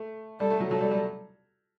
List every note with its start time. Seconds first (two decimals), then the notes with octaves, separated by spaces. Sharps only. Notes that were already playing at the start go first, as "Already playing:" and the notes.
Already playing: A3
0.40 G3 A4
0.50 A3
0.60 F#3
0.71 F#3 A4
0.81 G3
0.91 G3